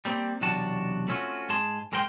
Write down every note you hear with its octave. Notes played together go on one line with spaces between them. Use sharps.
G3 A#3 C4
B1 E2 C3 D4 F#4 A5
A3 C4 C#4 F4 F#4
G#2 G#4 A5 C6
G#2 G#3 A#4 C5 G5 C6